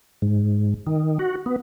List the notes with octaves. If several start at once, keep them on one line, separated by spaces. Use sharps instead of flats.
G#2
D#3
F#4
B3